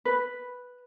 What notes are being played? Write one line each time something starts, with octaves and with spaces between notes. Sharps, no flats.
B4